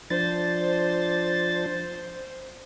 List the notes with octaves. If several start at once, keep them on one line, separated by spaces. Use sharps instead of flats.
F3 D4 C5 A6